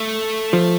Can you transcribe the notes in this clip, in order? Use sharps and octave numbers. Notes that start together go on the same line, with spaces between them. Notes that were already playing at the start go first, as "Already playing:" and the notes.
Already playing: A3
F3